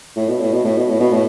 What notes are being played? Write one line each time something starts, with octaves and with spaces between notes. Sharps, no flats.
A2
B2
A2
B2
A2
B2
A2
B2
A2